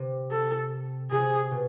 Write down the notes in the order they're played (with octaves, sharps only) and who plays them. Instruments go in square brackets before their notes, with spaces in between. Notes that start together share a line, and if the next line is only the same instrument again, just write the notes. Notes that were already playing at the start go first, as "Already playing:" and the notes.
Already playing: [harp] C3
[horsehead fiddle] A4
[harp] C3 [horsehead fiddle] G#4
[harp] B2